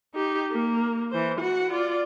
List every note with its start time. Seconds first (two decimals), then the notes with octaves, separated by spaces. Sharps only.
0.14 D#4 G4
0.52 A#3
1.11 E3 C5
1.40 F#4 F#5
1.71 F4 D5